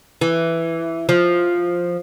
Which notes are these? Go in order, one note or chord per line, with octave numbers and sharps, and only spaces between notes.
E3
F3